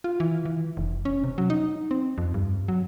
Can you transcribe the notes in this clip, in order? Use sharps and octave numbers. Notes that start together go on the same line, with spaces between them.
F4
E3
E3
F1
C#4
C3
F#3
D#4
C4
F2
G2
F#3